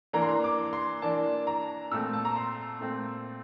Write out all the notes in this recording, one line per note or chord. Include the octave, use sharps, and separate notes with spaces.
E3 A#3 D4 A#5
C6
A#5
D6
C6
E3 A#3 D4 A5
A#5
A#2 A3 C4 E6
A5
A#5
C6
A#2 A3 C4